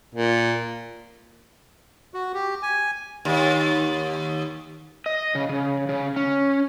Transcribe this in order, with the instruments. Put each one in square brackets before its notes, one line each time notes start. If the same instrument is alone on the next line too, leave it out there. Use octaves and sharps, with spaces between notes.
[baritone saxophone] A#2
[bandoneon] F#4
G4
G#5
[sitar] D#2
[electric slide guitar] D#5
C#3
C#3
C#3
C#4